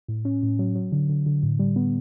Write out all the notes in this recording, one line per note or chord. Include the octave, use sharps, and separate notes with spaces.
A2
C#4
A2
F#3
F#3
D3
D3
D3
A2
G3
B3